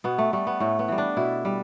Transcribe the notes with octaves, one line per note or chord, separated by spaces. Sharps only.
B2 B3
A3
G3 A3
B3
A2 A3
B3
E3 G3
D4
B2 E4
G3